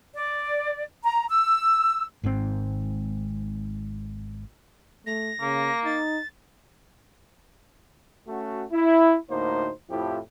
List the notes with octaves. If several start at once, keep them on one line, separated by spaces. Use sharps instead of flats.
D5
A#5
E6
G#1 G#2 C#3 C4
A3 A#6
C#3 A#3
D#4 A6
A3 C#4 F#4
E4
D2 A2 A#3 D#4 C5
F2 A2 F3 E4 G4